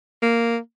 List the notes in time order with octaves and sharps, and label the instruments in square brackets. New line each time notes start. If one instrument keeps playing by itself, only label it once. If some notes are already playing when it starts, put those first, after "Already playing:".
[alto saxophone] A#3